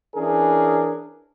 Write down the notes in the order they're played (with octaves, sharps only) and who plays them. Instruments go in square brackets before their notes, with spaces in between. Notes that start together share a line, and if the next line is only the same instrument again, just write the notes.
[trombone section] E3 C#4 D4 G#4 A#4